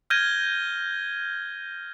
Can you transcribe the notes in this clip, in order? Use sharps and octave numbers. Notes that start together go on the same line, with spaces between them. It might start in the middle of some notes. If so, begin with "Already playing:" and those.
F6 G6 G#6 A#6 D#7 G7